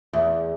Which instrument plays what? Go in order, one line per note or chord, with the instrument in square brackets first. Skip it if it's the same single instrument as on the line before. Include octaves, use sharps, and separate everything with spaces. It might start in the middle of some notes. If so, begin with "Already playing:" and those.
[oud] E2